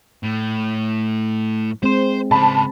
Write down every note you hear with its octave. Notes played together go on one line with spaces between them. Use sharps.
A2
G#3 C4 C5 C6
C#3 C5 A5 B5